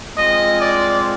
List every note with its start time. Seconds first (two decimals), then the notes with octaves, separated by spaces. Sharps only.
0.17 G#3 C4 F4 D#5
0.60 D5